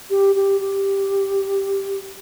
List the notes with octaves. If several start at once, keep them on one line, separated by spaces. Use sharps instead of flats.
G4
G4
G4